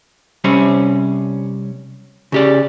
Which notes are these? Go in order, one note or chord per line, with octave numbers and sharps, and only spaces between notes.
C3 G3 C4 C#4
C#3 G4 D5